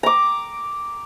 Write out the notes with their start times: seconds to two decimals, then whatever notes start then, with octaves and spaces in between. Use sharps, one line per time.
0.03 A#5 D6